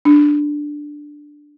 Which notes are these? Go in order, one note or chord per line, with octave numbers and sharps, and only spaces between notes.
D4